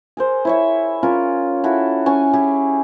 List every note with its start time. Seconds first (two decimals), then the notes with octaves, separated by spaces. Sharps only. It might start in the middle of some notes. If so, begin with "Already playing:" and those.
0.17 G#4 A#4 C5
0.45 E4 C#5 E5
1.03 C#4 F4 A#4
1.64 E4 F#4 A4
2.06 C#4 G#5 C#6
2.33 E4 G4 G#4